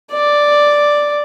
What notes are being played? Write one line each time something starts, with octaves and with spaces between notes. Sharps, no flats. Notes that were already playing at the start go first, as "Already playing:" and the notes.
D5